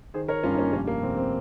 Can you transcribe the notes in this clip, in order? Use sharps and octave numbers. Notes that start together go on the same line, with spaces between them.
D#3 G#4 C5
A#4 C#5
G2 C#4 F4
D#4
A#3 C#4
F1 A#3 C#4
A#3
F1 C4
C4